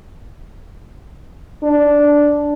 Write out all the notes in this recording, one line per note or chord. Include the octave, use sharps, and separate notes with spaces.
D4